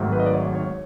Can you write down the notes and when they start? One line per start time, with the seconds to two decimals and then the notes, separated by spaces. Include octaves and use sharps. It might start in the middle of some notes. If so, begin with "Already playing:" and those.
Already playing: G#1 G#2 D#3 F#3 A3
0.12 B4
0.20 D#5
0.26 D5
0.33 C#5
0.55 C#5